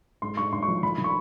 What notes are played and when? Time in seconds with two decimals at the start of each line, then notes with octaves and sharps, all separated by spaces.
0.22 G#2 C6
0.37 G#2 C#6
0.52 G#2 C6
0.62 C#6
0.68 F3
0.83 D#3 B5
0.98 D#3
1.04 C#6